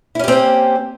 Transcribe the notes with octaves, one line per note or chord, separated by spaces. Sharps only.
A#3 C4 C#4 E4 G4